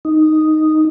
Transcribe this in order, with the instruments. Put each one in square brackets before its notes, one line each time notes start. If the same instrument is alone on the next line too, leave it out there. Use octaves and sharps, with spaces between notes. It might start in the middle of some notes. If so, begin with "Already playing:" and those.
[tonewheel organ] D#4